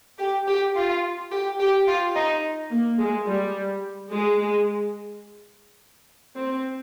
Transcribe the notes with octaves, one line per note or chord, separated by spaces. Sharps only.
G4
G4
F4
G4
G4
F4
D#4
A#3
G#3
G3
G#3
C4